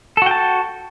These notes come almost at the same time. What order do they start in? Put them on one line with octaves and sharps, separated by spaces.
A4 F#4 G5 A5